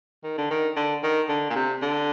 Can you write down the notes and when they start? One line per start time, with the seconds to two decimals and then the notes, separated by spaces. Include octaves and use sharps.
0.24 D#3
0.38 D3
0.51 D#3
0.76 D3
1.03 D#3
1.29 D3
1.50 A#2
1.56 C3
1.82 D3